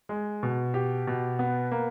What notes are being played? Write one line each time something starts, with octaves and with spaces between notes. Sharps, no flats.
G#3
B2
G4
B2
B3
A#3